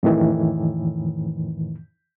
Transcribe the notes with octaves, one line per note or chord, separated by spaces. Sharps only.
F2 A2 D#3 E3